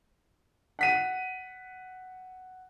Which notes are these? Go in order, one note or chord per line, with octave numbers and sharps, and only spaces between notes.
F#5 B6 D#7